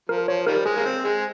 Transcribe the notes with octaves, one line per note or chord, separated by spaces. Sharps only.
F3 A#4
F3 C#5
D#3 G3 A#4
G#3 G#4
A#3
C4
G#3